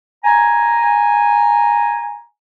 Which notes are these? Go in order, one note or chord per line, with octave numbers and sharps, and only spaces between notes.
G#5 A#5